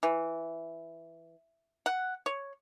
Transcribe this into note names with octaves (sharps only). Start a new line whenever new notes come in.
E3
F#5
C#5